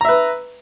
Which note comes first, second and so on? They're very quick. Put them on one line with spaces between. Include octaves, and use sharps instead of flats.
A#5 E5 B4